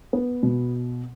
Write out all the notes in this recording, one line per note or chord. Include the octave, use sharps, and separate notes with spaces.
B3
B2